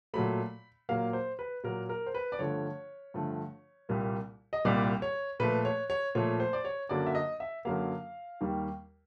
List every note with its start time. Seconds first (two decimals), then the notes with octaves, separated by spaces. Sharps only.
0.14 A#2 F#3 A3 B5
0.89 A#2 F#3 A#3 F5
1.13 C5
1.39 B4
1.64 A#2 F#3 A#3 A#4
1.89 A#4
2.06 C5
2.15 B4
2.32 D5
2.39 G2 D3 F3 A3 C#5
3.14 G2 D3 F3 A3
3.89 C2 A#2 G3 A#3
4.53 D#5
4.65 C2 A#2 G3 A#3 D5
5.02 C#5
5.40 A#2 F3 A3 B4
5.65 C#5
5.90 C#5
6.15 A#2 F3 A3 C#5
6.40 C5
6.53 D5
6.65 C#5
6.89 F#2 D3 F#3 A#3 D5
7.06 E5
7.15 D#5
7.40 E5
7.65 F#2 D3 F#3 A#3 F5
8.41 D#2 D#3 G3 A#3